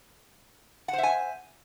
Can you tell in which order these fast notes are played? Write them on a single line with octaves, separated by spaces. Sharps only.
F#5 C5 E5 G#5